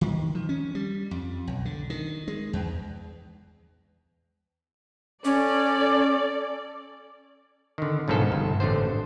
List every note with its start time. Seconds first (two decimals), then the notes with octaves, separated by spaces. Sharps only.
0.01 D#3
0.35 F3
0.49 C#4
0.75 G3
1.11 F2
1.47 B1
1.65 D3
1.90 D#3
2.28 G#3
2.53 E2
5.25 C#4 A4 D5
7.78 D3 D#3
8.08 B1 G#2 C#3 F3 A4
8.32 G1
8.60 A1 D3 A3 C5